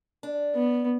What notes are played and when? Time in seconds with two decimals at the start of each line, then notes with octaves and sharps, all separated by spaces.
0.23 D4
0.55 B3